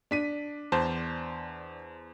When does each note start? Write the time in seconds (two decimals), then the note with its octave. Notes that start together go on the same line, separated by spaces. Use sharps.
0.11 D4 B6 D#7
0.72 E2 C5 A5